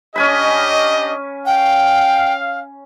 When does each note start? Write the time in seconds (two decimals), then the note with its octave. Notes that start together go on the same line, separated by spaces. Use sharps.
0.16 C#4 D4 G4 D#5 G#5 B5
1.46 F5 G5